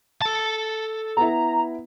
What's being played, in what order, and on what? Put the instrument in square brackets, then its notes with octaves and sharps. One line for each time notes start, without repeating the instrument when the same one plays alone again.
[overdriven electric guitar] A4 A5
[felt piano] B3 E4 [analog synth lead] A#5